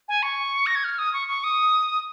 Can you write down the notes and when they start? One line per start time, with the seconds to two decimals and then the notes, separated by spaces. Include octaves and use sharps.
0.09 G#5
0.23 C#6
0.66 A#6
0.75 G#6
0.84 F6
0.99 D#6
1.13 C#6
1.28 C#6
1.44 D#6